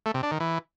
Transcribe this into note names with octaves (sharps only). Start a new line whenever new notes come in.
A3
C3
D4
D#3
E3